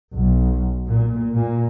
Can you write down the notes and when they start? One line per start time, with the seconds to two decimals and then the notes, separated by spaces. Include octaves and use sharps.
0.14 B1
0.86 A#2
1.33 A#2